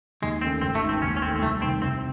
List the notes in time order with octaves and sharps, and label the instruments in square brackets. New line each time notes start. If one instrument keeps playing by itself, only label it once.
[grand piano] D#2 [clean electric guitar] G#3
[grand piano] D#3 A3 C#4 [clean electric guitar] C4
[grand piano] G#1 [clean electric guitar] C4
[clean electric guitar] A3
[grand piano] G#2 D#3
[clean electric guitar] C4
[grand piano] D#2 [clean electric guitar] C#4
[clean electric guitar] C#4
[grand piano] D#3 [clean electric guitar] C4
[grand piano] A3
[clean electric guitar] C4
[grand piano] C2 [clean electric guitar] A3
[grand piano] C3 D#3 [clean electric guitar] C4
[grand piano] C3 [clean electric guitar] C4